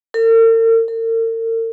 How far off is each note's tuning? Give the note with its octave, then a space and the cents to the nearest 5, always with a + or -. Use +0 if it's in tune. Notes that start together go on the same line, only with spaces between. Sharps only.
A#4 -45
A#4 -45